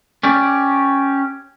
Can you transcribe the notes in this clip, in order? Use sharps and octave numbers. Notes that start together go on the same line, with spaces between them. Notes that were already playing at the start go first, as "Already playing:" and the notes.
C#4 G4 D5